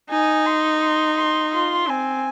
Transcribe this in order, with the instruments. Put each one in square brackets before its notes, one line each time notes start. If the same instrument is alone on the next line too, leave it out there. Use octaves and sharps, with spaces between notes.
[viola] D#4 [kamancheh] G#5
[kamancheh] C6
C6
C6
[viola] F4 [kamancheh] C6
[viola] C4 [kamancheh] G#5